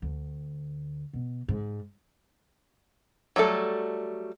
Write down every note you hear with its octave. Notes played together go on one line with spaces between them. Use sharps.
D2
B2
G#2
F#3 G3 A3 A4